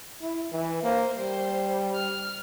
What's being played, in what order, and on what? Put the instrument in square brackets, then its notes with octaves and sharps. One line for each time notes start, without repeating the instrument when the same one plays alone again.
[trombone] E4
E3
[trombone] A#3 [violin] C5
[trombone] G3 [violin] C5
[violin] F6